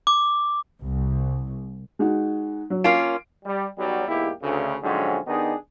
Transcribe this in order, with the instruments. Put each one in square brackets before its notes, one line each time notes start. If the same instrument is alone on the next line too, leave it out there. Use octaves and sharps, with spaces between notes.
[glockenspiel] D6
[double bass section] C2
[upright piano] G#3 D#4 F#4
F#3
[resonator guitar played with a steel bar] A#3 C#4 F4 [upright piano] D7
[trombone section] G3
B1 F#3 G3
E2 G#2 A#3 E4 G4
D2 C#3
G#2 D3 F3 F#3 C4 C#4
D#3 B3 D4 D#4 G4 G#4